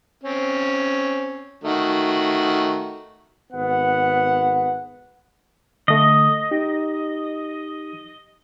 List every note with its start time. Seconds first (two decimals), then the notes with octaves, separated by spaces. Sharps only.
0.24 C4 C#4
1.64 D#3 A3 F#4
3.52 G#1 B3 F#5
5.88 D3 A3 D#5
6.51 D#4 G4